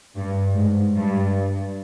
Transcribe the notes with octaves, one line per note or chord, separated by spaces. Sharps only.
G2
G#2
G2